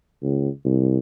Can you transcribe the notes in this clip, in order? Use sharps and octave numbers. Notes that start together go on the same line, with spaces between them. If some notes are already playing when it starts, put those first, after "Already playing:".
C#2
C2